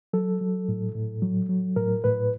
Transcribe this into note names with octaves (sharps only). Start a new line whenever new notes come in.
F#3 A4
F#3
A2
A2
F#3
F#3
A2 A#4
A2 B4